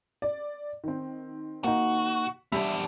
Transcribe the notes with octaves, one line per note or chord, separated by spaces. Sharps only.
D5
D#3 C4
A#3 D#4 F#4
E2 G3 D4 E5